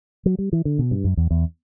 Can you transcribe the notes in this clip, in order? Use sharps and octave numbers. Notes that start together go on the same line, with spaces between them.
F#3
G3
E3
D3
B2
G2
F#2
E2
E2